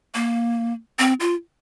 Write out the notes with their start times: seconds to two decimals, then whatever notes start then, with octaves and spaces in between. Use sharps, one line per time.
0.15 A#3
0.99 C4
1.20 F4